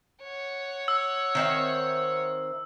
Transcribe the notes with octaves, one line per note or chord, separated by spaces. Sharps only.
C#5 F#5
E6
D#3 C4 E5